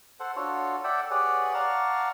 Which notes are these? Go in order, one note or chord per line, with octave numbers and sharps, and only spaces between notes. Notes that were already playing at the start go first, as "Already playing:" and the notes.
A4 C5 F#5
D4 F4 F#4 A4 C#5
A4 D5 E5 F#5 G5 A5
G4 G#4 B4 C#5 D5 F#5
D5 F5 F#5 A5 A#5 C#6